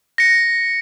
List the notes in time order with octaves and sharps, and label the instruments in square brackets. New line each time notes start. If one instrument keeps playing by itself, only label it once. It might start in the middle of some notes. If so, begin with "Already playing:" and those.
[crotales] A#6 C#7